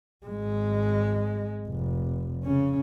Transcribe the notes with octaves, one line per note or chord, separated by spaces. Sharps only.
G#1 G#3
F1
C#3 C#4